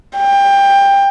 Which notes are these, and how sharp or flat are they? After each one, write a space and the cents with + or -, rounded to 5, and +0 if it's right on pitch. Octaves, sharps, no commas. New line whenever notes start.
G5 +20